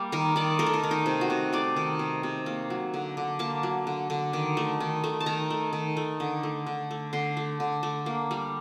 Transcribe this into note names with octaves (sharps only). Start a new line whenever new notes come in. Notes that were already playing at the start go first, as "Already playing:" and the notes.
Already playing: G3 A#3 G4
D#3 A#4
D#3 D5
A3 A#4
A4
A#4
D#3
D#4
C3
F#4
C3
A3 D5
D#3
C3
C3
A#3
F#3
D3
D3
A#3 A5
F#3
D3
D3
D#3
A3
D#3
A3
A5
D#3 A#5
A3
D#3
A3
D3
A3
D3
A3
D3 C6
A3
D3
A3
A#3
G3